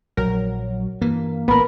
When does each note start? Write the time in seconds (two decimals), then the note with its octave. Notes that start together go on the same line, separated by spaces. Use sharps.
0.17 A#1 F#3 A#4
1.01 G2 E3 A#3
1.48 A1 A#2 B3 A#4 B5